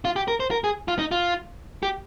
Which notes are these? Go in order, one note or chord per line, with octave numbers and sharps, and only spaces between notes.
F4
G4
A#4
C5
A#4
G#4
F4
D#4
F4
G4